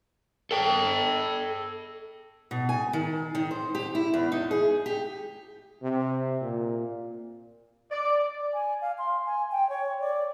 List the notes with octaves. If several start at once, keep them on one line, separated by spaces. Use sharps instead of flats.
A4 G5
B2
G#5
D#3
D#3
C5
G4
E4
E2
D#4
G#4
G4
C3
A#2
D5
G#5
F5
C6
G#5
G5
C#5
D5